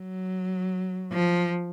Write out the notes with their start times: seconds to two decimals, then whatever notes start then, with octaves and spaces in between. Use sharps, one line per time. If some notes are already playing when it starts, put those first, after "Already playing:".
Already playing: F#3
1.12 F3